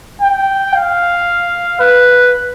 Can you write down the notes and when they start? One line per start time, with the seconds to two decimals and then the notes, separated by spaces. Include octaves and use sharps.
0.22 G5
0.75 F5
1.80 B4